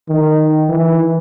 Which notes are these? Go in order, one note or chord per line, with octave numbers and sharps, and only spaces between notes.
D#3
E3